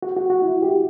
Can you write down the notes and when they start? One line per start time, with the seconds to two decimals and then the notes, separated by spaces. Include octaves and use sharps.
0.03 F#4
0.17 F#4
0.30 F#4
0.42 E4
0.62 G4